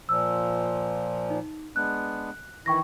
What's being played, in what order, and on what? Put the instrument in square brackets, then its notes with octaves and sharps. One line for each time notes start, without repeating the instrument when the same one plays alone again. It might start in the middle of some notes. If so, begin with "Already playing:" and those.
[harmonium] A#2 F3 [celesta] E6
[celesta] D#4
[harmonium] G#3 B3 D4 [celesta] F#6
[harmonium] D#3 E3 E4 [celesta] G5 C#6 A#6